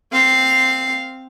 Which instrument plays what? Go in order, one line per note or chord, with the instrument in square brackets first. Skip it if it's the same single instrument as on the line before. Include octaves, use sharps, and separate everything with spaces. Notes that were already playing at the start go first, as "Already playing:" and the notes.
[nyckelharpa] C4 F5